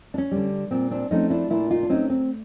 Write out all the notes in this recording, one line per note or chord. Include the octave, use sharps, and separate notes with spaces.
D4
C#4
D3 G3
A#2 C4
C4 D4
F3 A3 C4 C#4 D#4
D4 E4
A#2 D4 E4
D#4 F4
D4
F#3 A3 C4 C#4 D#4
C4